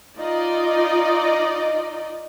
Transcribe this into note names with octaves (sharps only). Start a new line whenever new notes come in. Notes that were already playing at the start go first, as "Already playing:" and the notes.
D#4 F4 D5 D#5